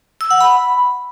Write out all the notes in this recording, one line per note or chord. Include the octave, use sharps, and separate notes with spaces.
E6
F#5
B5